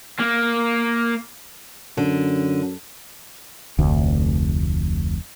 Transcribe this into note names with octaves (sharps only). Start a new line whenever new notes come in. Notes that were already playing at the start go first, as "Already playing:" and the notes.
A#3
F#2 D3
F1 D2